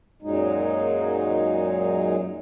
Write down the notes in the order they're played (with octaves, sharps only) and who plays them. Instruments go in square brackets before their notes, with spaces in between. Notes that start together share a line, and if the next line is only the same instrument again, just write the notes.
[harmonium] F#2 A#2 F#3 G#3 D#4